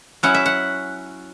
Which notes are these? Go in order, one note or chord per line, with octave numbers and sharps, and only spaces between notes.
F#3 C#4 E4 F#5
E5
F#5